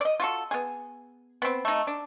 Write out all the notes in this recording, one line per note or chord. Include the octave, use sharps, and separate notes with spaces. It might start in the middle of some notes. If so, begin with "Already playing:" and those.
D5 D#5
F4 F#4 A4
B3 G#4
B3 C4
A3 D#4
D4